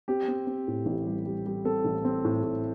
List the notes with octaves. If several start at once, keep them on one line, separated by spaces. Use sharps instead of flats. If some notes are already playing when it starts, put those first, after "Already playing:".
C4 G4
C4
C4
A2
A1
G3
G3
G3
C4 A4
A1
C4
A2
A2